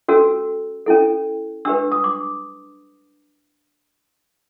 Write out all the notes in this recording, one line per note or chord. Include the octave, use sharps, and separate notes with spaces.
C#4 F#4 A4 E6
C#4 E4 A4
D4 G4 B4 E6
D#6
D6